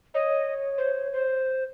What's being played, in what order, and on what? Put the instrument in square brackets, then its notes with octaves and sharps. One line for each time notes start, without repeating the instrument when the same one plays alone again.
[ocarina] C#5 [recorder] D#5
[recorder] C5
C5